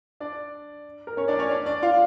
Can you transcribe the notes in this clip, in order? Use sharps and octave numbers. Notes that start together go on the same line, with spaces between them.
D4 D5
A#4
C#4 C#5
D4 D5
C#4 C#5
D4 D5
D4 D5
F4 F5